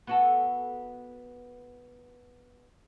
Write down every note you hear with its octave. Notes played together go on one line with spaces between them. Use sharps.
B3 F#4 A4